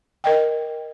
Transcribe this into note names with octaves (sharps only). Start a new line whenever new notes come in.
A#4 D#5 G5